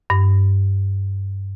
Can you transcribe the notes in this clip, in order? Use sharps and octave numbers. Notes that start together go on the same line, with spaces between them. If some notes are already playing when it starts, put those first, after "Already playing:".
G2